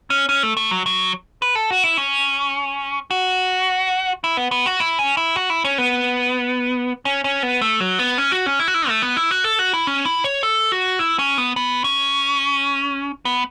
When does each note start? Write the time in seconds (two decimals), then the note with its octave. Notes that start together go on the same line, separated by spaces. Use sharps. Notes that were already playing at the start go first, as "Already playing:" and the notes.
0.10 C#4
0.29 C#4
0.43 A3
0.57 A3
0.71 F#3
0.86 F#3
1.42 B4
1.55 A4
1.70 F#4
1.84 E4
1.97 C#4
3.11 F#4
4.24 E4
4.37 B3
4.51 B3
4.66 F#4
4.80 E4
4.99 C#4
5.17 E4
5.36 F#4
5.50 E4
5.64 C#4
5.78 B3
7.05 C#4
7.24 C#4
7.43 B3
7.61 A3
7.80 F#3
7.99 B3
8.18 C#4
8.32 F#4
8.46 C#4
8.60 E4
8.68 F#4
8.74 E4
8.89 A3
9.02 B3
9.17 E4
9.31 F#4
9.44 A4
9.59 F#4
9.74 E4
9.87 C#4
10.05 E4
10.24 C#5
10.43 A4
10.72 F#4
10.99 E4
11.19 C#4
11.38 B3
11.56 B3
11.84 C#4
13.25 B3